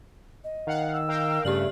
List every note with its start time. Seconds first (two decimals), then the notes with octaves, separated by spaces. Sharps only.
0.44 D#5
0.67 D#3 F5 F#5
0.93 E6
1.08 A#4 F5 G5
1.45 G2 C#3 A3 G4 D5 F6 F#7